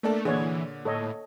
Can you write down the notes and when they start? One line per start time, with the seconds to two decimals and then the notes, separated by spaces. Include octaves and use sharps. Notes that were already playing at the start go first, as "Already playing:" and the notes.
0.03 A3 A#3 D4 A4
0.25 A#2 D3 E3 G#4 C#5
0.85 A2 A4 C#5 D#5